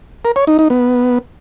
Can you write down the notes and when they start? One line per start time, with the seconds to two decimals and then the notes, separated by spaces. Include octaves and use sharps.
0.25 A#4
0.36 C#5
0.47 D#4
0.59 D#4
0.70 B3